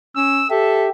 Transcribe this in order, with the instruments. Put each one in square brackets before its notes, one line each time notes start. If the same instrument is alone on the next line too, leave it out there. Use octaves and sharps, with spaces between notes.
[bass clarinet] C#4 [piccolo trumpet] E6
[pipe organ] G4 [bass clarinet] A4 [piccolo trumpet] E5